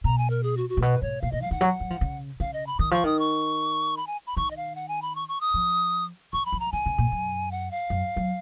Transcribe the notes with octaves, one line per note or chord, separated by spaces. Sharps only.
B2 A#5
G#5
A#4
G#4
F#4
F#4
A#2
B2 B4
G#2 C#5
A#2 F5
A#2 D#5
F3 F5
D#3 F#5
F#3
F#3
F3
C#3
C#3 F5
D#5
B5
D#3 D#6
F3 C#6
D#3 D#6
C#6
B5
G#5
B5
D#3 C#6
D#5
F5
F#5
G#5
B5
C#6
C#6
D#6
F3
F3 C#6
B5
F3
A#5
D#3 G#5
C#3
A#2
F#2
F#5
F5
F#2
F#3